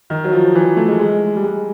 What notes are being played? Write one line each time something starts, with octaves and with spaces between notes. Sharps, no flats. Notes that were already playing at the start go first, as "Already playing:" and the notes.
D#3
F#3
F3
E3
A3
G#3
G#3
G3
G#3